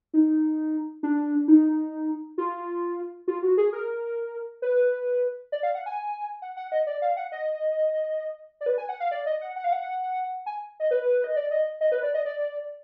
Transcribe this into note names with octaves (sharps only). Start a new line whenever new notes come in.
D#4
D4
D#4
F4
F4
F#4
G#4
A#4
B4
D5
F5
F#5
G#5
F#5
F#5
D#5
D5
F5
F#5
D#5
D5
B4
G#5
F#5
F5
D5
D#5
F#5
F#5
F5
F#5
G#5
D#5
B4
D#5
D5
D#5
D#5
B4
D5
D#5
D5